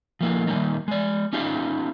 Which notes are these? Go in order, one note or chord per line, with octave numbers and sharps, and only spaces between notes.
F3 A#3 E4
D#3 G3 A#3 D#4
G#3 D5
C#4 D#4 F4 G4